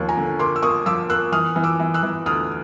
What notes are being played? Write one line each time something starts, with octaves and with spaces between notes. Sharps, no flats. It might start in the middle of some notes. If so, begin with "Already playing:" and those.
Already playing: D#2 F3 A#3 C#6
G#5 A#5
D3
A#3 C6 D6
E6
A#3 C#6 D#6
F3 D6 E6
A#3 E6 F#6
E3 D#6 F6
E3
D6 E6
E3
E6 F#6
E3
D2 D#6 F6